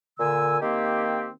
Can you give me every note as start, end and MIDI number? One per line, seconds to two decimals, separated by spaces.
0.18 0.57 46
0.18 0.57 50
0.18 0.57 80
0.18 0.57 88
0.61 1.30 51
0.61 1.30 58
0.61 1.30 60
0.61 1.30 67